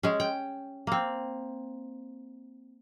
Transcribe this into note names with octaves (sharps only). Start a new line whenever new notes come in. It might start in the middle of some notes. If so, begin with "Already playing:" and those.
G#3 C#4
G5
A#3 C4